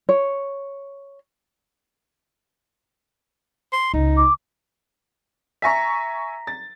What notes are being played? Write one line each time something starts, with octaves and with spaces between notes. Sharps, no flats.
C#5
C6
C#2 D#4
D6
E5 G#5 A#5 C#6 A#6 B6
A6